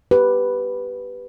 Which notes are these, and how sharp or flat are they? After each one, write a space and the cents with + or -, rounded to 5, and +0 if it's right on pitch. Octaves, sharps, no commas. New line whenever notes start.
G4 -5 B4 +0